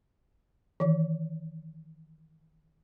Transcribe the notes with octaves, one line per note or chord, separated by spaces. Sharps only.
D#3 E3